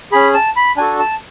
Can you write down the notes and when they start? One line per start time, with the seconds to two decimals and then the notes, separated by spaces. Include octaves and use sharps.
0.12 C#4 G#4 B5
0.34 A5
0.56 B5
0.77 D4 F#4 A4 G#5
0.99 A5